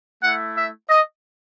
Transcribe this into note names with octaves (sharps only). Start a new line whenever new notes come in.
A3 E4 F#5
E5
D#5